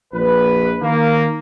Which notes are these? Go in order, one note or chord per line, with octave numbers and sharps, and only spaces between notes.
A#1 B4
D#3 A#3